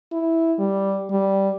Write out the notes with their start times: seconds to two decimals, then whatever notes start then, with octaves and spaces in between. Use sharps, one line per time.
0.12 E4
0.59 G3
1.11 G3